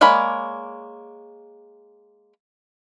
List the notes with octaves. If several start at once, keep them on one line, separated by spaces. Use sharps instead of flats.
G#3 A#3 C#5 D5 B5